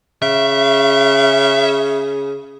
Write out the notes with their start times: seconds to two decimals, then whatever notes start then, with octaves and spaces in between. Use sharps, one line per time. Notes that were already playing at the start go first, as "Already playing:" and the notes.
0.22 C#3 E5